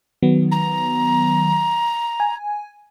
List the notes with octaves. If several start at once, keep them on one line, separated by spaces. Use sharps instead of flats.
D#3 F#3 B3
A#5
G#5